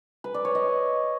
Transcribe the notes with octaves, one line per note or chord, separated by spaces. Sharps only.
B4
D5
C#5
D#5